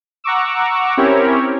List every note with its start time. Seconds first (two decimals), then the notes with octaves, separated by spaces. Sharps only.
0.24 F#5 A#5 C#6 D6 E6
0.97 C4 C#4 E4 G4 A#4 C#5